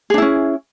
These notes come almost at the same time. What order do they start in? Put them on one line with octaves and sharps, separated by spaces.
G#4 D4 E4 C#4